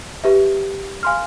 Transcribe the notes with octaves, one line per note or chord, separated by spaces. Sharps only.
G4 B4 E5
F5 G#5 C6 F6